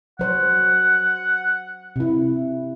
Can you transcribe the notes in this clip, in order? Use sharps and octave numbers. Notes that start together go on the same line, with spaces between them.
F#3 C5 C#5 F#5
C3 E4